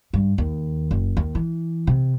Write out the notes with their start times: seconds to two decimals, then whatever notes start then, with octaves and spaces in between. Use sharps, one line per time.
0.13 G2
0.38 D#2
0.91 F#1
1.17 D#2
1.35 E3
1.87 C3